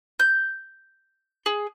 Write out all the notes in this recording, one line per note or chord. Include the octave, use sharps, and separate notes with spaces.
G6
G#4